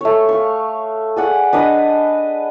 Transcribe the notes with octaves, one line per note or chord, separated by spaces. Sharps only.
A3 C#5
F5 C#6
G#4 D5 F#5
D4 B4 D#5